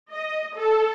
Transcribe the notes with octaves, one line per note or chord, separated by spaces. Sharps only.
D#5
A4